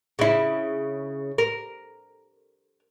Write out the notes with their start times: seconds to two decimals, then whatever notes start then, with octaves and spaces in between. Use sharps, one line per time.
0.19 C#3 E4
1.38 A#4